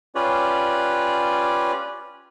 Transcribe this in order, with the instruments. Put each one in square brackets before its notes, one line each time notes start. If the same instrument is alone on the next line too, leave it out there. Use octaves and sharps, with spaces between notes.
[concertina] C#4 F4 G4 B4 C#5 D5